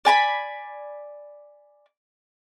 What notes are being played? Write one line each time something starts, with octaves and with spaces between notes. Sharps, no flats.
D5 G#5 A#5 B5